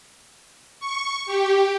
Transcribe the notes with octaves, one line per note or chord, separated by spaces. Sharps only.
C#6
G4